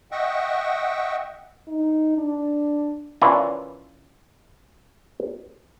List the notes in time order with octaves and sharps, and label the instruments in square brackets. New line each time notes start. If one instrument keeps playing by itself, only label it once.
[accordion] D#5 E5 F#5 G5 C#6
[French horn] D#4
D4
[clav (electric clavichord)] E3 C#4 D4 E4 F4 A#4